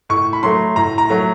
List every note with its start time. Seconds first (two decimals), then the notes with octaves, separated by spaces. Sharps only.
0.09 A2 C#6
0.33 B5
0.43 F#3 A3 C6
0.76 A2 A#5
0.98 A#5
1.09 F#3 A3